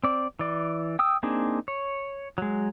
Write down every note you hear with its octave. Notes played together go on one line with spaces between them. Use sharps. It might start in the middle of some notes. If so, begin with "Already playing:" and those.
C4 D5
E3 D5
G5 D#6 E6
A#3 C4 D4 D#4 G#4
C#5
F#3 G#3